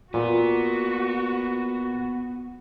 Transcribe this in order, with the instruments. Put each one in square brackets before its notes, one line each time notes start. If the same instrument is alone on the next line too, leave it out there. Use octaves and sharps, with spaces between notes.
[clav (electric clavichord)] A#2 [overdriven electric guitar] B3 [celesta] F4 [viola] F#4